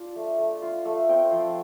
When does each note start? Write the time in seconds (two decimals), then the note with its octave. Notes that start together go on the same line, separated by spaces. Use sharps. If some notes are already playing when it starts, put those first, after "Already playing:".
Already playing: D4 F4
0.16 A3
0.39 A3
0.62 F4
0.85 A3
1.08 C4 G5
1.31 F3